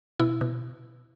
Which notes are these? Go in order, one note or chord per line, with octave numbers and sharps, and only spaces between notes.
B2 E4
B2